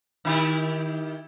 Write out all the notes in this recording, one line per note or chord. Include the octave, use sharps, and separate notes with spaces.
D#3 E4 G4